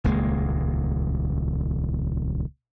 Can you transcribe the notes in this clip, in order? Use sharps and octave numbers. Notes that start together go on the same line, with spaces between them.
D#1 C#2 G#3 A#3